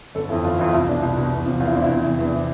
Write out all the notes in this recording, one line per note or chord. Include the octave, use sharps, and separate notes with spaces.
G1 A4
F2 E3 A4
G1 F4
F2 E3 E4
F4
C2 E4
B2 D4
C2 D4
B2
E2
C3 F3
E2 F4
E4
C3 F3 D4
E4
E2
C3 E3
E2 D4
C3 E3